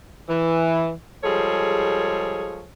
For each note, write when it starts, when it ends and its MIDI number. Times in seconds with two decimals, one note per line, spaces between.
0.29 0.91 52
1.23 2.66 53
1.23 2.66 55
1.23 2.66 56
1.23 2.66 68
1.23 2.66 69
1.23 2.66 73